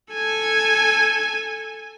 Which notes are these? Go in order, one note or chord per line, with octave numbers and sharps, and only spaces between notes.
A4 G#5